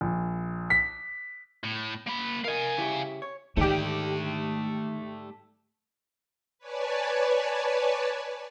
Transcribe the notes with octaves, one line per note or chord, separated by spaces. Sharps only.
A#1
B6
A2
A#3 B5
A#4 D#5 F5 G#5
C#3 E4 G4
C#5
G#2 D#3 A3 G4 D5
B4 C#5 D5 G#5 A5